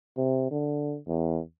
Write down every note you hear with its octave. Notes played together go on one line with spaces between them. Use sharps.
C3
D3
E2